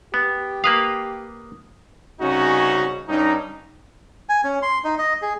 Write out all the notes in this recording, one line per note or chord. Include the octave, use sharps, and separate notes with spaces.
B3 G4
A#3 B4 F5 D#6
C2 C#3 C#4 D#4 F#4
G2 C#4 D#4
G#5
C#4
C6
D#4
D#5
G#4